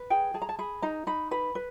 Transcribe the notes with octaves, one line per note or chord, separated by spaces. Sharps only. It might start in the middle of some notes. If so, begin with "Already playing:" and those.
Already playing: B4
G#4 G5
G#4 A5
A#5
A5
G#4 B5
D#4 A#5
D#4 B5
B4 B5
B4